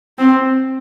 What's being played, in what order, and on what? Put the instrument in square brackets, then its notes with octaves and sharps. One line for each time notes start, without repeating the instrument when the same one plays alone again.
[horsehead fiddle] C4